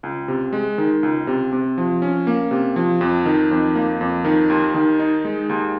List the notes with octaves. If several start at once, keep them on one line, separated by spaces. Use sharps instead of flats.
C#2
C3
G#3
D#3
C#2
C3
C3
F3
C#4
A#3
C3
F3
F2
D#3
F2
A#3
F2
D#3
D#2
D#3
D#4
G#3
D#2